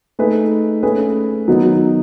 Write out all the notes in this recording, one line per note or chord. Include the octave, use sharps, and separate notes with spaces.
A3 D#4 G#4 B4
A3 C#4 G#4 B4
D#3 F#3 B3 D#4